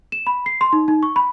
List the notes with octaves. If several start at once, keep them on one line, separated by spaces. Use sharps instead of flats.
E7
B5
C7
C6
D#4
D#4
C#6
B5